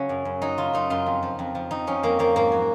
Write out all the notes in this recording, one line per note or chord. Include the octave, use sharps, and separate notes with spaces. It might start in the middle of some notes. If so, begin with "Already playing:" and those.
Already playing: C#3 F#3 C#4
F#2
F#2
F#3 D#4
C#3 F4
F#2 D#4
F#2 F4
F2
F3
F2
F3
F2 D#4
F3 C#4
F2 A#3
F3 A#3
G#2 A#3
F#3